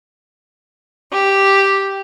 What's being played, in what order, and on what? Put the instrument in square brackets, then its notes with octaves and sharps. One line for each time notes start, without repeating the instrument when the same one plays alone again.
[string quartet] G4